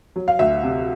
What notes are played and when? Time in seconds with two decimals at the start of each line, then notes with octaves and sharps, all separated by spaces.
0.16 F#3
0.28 F5
0.39 D2 E5
0.63 C3